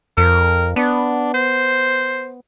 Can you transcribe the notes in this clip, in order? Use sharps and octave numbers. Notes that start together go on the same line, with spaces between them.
F2 A#4
B3 D4
C5